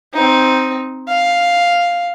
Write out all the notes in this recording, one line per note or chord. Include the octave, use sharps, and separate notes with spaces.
C4 D#4
F5